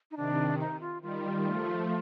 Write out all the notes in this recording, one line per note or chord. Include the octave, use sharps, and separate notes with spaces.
D#4
C3 D#3 D4
D#4
F4
D#3 G3 F4
F3 A3